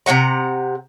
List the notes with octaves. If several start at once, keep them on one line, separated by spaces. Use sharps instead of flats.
C3 C#4 F#5 A#5